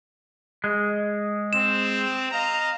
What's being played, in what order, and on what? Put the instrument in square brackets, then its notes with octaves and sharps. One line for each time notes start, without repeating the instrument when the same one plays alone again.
[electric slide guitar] G#3
[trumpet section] C4 [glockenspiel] E7
[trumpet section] D#5 F5 A#5